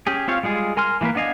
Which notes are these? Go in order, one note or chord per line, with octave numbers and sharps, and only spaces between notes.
C#4 G4 G#4
C4 F4 C#5 F5
G3 G#3 F4 G#4
A#4 G#5 C6 F6
E3 G#3 A#3 A#4 B4
B3 D4 D#5 F5 G#5